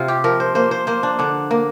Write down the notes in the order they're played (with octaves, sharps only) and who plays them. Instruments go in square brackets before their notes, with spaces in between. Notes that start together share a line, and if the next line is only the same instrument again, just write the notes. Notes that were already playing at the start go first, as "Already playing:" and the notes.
Already playing: [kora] C3 F4
G4
F3 A#4
C5
A#3 C5
C5
A#3 C5
D4
D3 D4
A#3